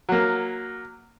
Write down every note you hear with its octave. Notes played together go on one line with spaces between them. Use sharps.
F#3 A#3